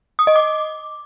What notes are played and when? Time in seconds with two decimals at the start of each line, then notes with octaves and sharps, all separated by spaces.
0.19 D#6
0.27 D#5
0.36 D6